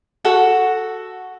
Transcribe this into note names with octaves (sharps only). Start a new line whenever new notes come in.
F#4 A4 F#5